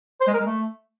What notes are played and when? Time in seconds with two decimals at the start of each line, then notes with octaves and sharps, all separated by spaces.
0.21 C5
0.27 G#3
0.34 A#4
0.40 G#3
0.46 A3